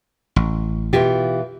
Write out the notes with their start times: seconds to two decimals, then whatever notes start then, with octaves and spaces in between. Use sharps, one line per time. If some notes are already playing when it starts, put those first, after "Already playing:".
0.36 A1
0.93 B2 E3 F4 G4